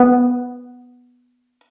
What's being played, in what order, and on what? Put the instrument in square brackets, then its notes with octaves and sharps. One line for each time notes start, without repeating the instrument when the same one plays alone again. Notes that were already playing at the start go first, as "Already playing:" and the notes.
Already playing: [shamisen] B3